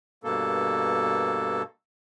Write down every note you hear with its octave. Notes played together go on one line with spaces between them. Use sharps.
G2 B2 A#3 A4